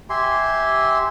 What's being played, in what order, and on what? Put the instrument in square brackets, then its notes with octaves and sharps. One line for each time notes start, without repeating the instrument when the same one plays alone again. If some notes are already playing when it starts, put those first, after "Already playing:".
[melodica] G4 E5 G#5 C6